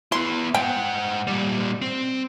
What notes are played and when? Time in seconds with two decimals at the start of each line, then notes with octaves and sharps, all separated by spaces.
0.12 B3 E4 C6
0.54 G#2 F#5 G5
1.27 A#2 G3
1.82 C4